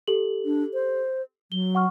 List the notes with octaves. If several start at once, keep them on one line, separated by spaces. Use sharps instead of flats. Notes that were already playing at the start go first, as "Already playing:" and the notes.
G4 A4 F#7
D4
C5
F#3 G7
F#5 C#6 F6